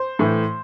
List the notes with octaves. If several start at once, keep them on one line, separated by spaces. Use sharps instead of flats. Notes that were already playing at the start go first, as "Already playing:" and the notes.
Already playing: C5
A2 E3